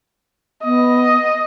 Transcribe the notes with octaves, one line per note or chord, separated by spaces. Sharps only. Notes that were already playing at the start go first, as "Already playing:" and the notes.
B3 D#5